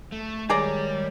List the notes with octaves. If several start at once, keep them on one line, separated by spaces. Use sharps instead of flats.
A3
D#3 G3 G#3 G#4 C#5 D5 A#5